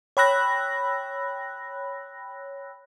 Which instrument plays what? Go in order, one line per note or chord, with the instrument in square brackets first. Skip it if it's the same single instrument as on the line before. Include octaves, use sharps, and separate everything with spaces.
[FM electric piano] C#5 G5 B5 E6 F#6 A#6